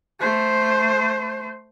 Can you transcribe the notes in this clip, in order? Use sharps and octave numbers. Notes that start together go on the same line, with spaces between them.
A3 C5